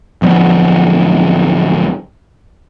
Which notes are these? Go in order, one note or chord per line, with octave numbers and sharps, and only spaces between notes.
D1 F3 G3 B3